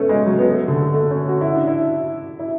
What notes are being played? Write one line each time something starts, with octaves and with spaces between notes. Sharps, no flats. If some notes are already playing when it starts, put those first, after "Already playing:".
Already playing: A3 B3 C#4
G#3
F#3
B3
A3
D3
A3
C#4
F#4
E4
D4
E4
E4